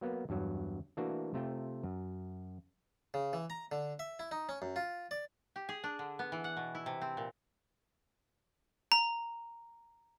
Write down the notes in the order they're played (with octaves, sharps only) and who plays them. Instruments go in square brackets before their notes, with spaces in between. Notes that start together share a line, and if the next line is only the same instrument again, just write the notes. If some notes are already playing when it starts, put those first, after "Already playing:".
[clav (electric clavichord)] F#3 A#3 B3
E2 G2 F#3
E3 A3 A#3 D4 F#4
C3 A3 F4 G5
F#2
[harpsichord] C#3
E3
A#5
D3
E5
E4
D#4
C#4
F#2
F4
D5
[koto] G4
G#4
D4
D3
B3
E3
F#5
B2
E4
C3
C4
A#2
[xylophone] A#5